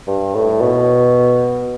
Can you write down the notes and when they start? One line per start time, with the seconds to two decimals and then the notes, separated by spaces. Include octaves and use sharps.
0.08 G2
0.35 A2
0.61 B2